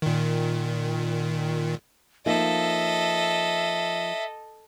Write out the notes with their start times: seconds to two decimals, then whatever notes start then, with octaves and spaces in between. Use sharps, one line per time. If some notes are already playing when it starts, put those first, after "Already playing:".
0.02 A#2 D#3
2.26 F3 A#3 D#4 A4 D#5 E5